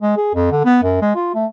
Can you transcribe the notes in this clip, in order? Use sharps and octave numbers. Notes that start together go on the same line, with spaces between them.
G#3
G#4
F2
D3
B3
F#2
G#3
F4
A3